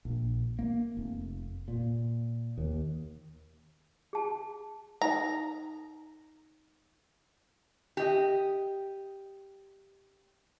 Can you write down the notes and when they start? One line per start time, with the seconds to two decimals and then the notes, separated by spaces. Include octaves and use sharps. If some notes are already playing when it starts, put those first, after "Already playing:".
0.05 A#1
0.59 A#3
0.97 F1
1.68 A#2
2.58 D#2
4.13 G#4 A5
5.02 D#4 A4 A#5
7.97 G4 D#5